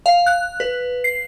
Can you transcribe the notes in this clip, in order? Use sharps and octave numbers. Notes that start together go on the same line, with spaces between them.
F5
F#6
B4
C7